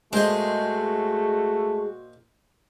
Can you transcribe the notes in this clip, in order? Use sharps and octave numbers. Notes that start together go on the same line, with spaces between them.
A#2 G#3 A3 F#4 G#4 C5 D#5